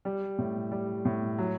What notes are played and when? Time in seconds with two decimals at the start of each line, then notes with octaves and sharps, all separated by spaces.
0.05 G3
0.38 A2
0.72 G3
1.05 A2
1.38 F#3